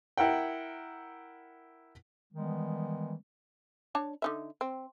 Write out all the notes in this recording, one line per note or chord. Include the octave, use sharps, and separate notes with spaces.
E4 A#4 F#5 G5
D#3 E3 G3 G#3 B3
D4 C#5 A5
D3 D#4 E5
C4